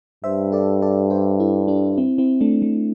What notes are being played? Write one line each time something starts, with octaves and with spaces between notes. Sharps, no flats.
G2 C5 E5
A4 D5
A4 D5
G4 C5
E4 A4
D4 G4
C4 E4
C4 E4
A3 D4
A3